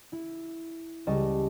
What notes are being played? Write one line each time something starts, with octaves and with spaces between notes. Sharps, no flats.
E4
C#2 G3 D#5 A5 C#6 E7